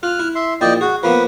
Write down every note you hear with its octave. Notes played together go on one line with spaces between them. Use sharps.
F4 F6 F#6
E4
E5 C6
A#1 A#2 E4 D5 D#5 G5
F#4 G#4
F3 A#3 B3 B4